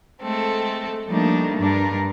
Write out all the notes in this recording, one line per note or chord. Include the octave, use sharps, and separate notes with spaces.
G#3 A3 C4 A4
F3 G3 A3 A#3 D4 D#4
G2 D4 A#4